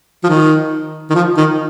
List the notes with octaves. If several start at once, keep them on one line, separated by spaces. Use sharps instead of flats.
F3
D#3
D#3
F3
D#3